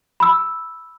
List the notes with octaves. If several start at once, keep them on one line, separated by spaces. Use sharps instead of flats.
B5 E6